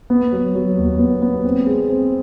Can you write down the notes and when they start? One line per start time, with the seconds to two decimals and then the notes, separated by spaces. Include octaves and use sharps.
0.10 B3
0.32 F#3
0.55 F#3
0.77 D#2
0.99 B3
1.22 B3
1.45 C4
1.66 G#3
1.89 C4